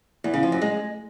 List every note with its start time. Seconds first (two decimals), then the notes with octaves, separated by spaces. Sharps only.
0.24 E2
0.34 C#3
0.43 F3
0.52 F#2
0.62 G#3